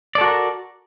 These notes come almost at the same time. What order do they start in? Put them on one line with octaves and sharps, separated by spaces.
D5 A4 F#4 A#4